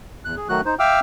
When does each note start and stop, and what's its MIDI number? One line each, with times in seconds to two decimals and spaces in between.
0.25 0.35 40
0.25 0.35 90
0.37 0.48 68
0.49 0.61 51
0.49 0.61 54
0.49 0.61 57
0.49 0.61 66
0.49 0.61 90
0.65 0.75 63
0.65 0.75 72
0.79 1.00 76
0.79 1.00 77
0.79 1.00 79
0.79 1.00 86
0.79 1.00 88
0.79 1.00 89